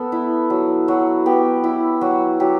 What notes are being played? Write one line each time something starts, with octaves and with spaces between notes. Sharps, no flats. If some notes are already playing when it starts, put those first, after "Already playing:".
Already playing: B3 A4
E4
F#3
F#3 F#4
B3 G4
E4
F#3 F#4
F#3 G4